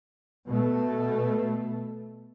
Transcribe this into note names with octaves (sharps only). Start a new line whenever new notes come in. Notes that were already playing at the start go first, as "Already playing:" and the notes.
B2 A3